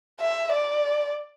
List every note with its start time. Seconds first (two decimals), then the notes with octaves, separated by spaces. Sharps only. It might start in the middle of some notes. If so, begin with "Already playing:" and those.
0.21 E5
0.52 D5